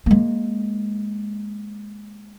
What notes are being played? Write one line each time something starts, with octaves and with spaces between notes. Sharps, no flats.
G#3 A#3